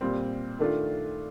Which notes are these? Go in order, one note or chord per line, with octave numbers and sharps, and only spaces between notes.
A#2 G3 C4
D#3 A3 D4 F4